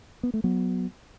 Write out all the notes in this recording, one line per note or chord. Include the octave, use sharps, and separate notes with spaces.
B3
A3
F#3 B3